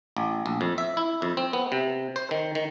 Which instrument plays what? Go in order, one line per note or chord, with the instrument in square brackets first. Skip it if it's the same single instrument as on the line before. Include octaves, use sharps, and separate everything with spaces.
[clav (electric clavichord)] A1
A#1
F2
E5
E4
F2
C4
B3
C3
C5
D#3
D#3